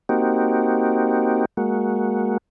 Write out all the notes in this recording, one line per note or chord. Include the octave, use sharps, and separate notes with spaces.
A#3 C4 D#4 F#4 G4
G#3 A#3 F#4